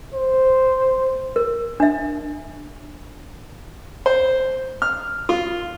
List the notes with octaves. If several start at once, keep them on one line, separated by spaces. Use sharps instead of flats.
C5
A#4
D4 E5
C5
F6
F4